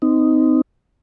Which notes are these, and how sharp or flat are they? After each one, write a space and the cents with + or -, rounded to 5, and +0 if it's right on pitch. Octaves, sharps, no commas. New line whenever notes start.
C4 -30 D#4 +0